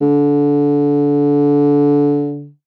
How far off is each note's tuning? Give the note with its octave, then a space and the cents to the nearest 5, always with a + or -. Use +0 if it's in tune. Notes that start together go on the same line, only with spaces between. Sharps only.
D3 -25